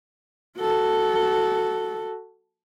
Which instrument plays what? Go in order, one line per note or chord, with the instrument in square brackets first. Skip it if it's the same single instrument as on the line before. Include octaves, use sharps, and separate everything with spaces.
[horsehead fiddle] F#4 A4